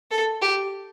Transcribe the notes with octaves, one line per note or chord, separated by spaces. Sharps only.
A4
G4